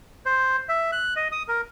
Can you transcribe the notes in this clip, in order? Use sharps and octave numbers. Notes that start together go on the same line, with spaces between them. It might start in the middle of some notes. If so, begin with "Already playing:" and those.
C5
E5
F#6
D#5
D#6
A#4